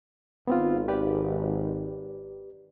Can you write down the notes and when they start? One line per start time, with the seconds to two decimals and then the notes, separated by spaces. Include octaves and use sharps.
0.47 G#1 B3 C4 F4
0.88 G4 B4 D5